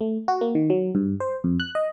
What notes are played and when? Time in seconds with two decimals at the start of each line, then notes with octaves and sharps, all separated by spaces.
0.01 A3
0.28 F#4
0.41 A#3
0.55 D#3
0.70 F#3
0.95 G2
1.20 C5
1.44 F2
1.60 F#6
1.75 D#5